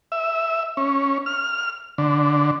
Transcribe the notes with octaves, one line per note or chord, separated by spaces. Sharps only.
E5
C#4
F6
D3